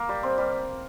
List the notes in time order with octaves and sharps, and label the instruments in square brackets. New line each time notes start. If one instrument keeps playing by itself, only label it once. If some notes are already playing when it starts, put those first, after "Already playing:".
Already playing: [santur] A#3
G3
C4
G3